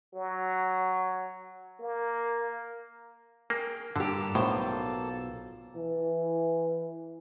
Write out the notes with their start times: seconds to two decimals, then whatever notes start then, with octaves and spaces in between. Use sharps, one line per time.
0.14 F#3
1.80 A#3
3.50 A#3 G#4 G5
3.96 G2 D3 A#3 G4 A4 A5
4.35 B1 A2 F4 C5
5.76 E3